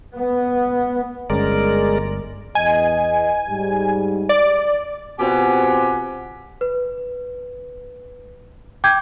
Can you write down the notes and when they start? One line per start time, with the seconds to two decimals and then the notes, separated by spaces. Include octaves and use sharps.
0.14 B3
1.30 G1 G#3 C#4 A#4 D5
2.55 E2 D#5 G#5
3.48 G#2 G3
4.29 D5
5.19 B2 C4 F4 G4 F#5 G#5
6.61 B4
8.84 G5 D6 G6 G#6